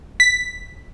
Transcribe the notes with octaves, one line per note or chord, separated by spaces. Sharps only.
B6